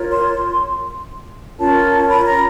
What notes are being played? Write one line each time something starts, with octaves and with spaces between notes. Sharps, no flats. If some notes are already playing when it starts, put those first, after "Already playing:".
Already playing: F4 A#4 C#5
C6
C#4 F4 A#4 C#5 A5
B5
A#5